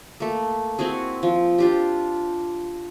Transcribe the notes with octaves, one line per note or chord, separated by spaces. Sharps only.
A3 A#3
C4 E4 F#4 G#4
F3
D4 F4 G4